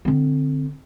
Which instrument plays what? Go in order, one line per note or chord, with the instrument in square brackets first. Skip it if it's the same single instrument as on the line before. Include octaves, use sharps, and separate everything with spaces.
[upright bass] D3 C4